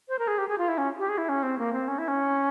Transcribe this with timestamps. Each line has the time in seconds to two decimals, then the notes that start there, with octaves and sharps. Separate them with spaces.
0.09 C5
0.19 A#4
0.28 G#4
0.38 G4
0.48 G#4
0.58 F4
0.68 E4
0.78 C#4
0.99 G4
1.09 G#4
1.18 E4
1.29 C#4
1.43 C4
1.59 A#3
1.73 C4
1.88 C#4
1.98 E4
2.08 C#4